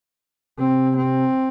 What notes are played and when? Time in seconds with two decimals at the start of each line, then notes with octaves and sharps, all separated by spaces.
0.59 C3 C4
0.97 C4